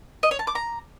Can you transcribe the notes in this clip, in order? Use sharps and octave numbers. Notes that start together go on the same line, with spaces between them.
D#5
C#5
A5
D6
A#5